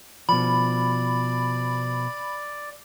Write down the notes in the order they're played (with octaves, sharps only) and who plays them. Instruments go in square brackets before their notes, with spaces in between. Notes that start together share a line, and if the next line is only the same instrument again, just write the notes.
[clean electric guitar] B2 F3 [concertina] D5 [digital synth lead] B5